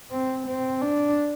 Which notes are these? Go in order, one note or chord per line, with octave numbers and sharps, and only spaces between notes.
C4
C4
D4